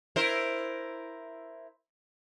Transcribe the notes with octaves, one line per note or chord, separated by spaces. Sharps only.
E4 A#4 C5